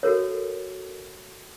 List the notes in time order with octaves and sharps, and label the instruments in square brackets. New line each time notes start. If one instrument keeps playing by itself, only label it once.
[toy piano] F#4 A4 A#4 C#5